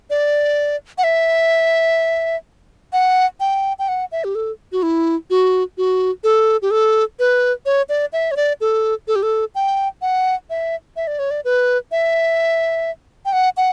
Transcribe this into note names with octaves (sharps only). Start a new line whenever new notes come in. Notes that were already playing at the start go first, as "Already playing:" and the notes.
D5
F#5
E5
F#5
G5
G5
F#5
E5
G4
A4
F#4
E4
F#4
F#4
A4
G4
A4
B4
C#5
D5
E5
C#5
D5
A4
A4
G4
A4
G5
F#5
E5
E5
D5
C#5
D5
B4
E5
G5
F#5
F#5